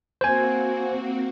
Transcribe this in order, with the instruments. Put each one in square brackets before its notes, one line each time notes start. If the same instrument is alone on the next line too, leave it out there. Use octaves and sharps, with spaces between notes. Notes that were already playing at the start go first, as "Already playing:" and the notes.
[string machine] A#3 C4 F#4 [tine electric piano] C5 G#5